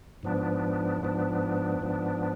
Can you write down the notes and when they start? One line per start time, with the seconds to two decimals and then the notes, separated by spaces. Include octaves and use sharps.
0.23 G#2 F3 B3 D4
1.02 G#2 F3 B3 D4
1.80 G#2 F3 B3 D4